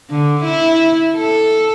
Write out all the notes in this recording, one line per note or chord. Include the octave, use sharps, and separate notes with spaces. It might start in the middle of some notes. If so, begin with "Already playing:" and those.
D3
E4
A4